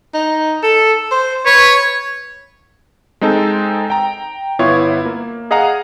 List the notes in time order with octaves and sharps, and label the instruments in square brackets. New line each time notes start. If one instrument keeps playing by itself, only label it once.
[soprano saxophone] D#4
A4
C5
[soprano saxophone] B4 [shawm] C#5
[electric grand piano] G#3 C4 D#4 A4 A5
G5 A#5
G1 B3 E4 F4 C#5
A#3
G#4 D#5 F5 F#5 A#5